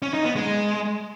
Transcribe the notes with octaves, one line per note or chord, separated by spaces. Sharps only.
C#4
D#4
B3
G#3